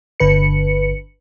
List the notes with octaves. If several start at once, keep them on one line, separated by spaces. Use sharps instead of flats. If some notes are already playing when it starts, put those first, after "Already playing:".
G1 D3 B4 C#7